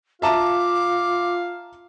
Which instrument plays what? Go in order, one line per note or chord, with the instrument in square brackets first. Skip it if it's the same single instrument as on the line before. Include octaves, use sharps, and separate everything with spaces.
[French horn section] F4 [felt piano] E5 A5 A#5 [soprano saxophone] F5 [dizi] D6